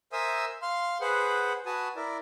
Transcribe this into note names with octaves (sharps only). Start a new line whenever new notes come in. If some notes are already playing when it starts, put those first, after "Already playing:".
A#4 C5 E5 G#5 D#6 E6
F5 C6
G#4 B4 C5 F#5
F#4 B4 G#5 A5 D#6
E4 A#4 D5